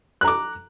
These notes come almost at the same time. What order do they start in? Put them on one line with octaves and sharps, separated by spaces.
F#6 A#5 D6